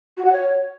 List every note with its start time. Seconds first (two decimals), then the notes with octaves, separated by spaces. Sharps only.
0.17 F#4
0.25 F#5
0.32 C#5